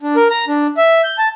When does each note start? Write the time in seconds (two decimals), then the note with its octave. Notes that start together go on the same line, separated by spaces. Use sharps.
0.01 D4
0.16 A#4
0.31 A#5
0.48 D4
0.77 E5
1.04 G6
1.18 A5